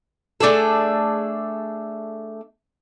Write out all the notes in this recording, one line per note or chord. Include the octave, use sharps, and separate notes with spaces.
A3 D4 G#4 A4